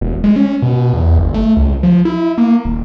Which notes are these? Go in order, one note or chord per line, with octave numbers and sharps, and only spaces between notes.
E1
G#3
C#4
B2
E2
G1
A3
C#2
F3
E4
A#3
D#1